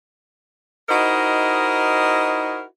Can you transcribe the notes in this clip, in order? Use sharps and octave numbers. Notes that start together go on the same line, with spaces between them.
D#4 E4 F#4 A#4 C5 D#5